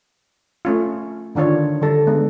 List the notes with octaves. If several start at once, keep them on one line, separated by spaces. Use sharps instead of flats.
A3 C#4 F4
D3 D#3 D4 F4 C#5
D3 G3 A4
G#3 B3 D4